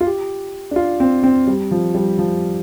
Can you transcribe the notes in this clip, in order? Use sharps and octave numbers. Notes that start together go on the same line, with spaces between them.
F4
G4
D4
F4
C4
C4
G3
F3
G3
F3